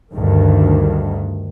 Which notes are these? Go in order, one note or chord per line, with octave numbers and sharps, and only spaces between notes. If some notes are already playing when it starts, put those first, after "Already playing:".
D2 G2 D#3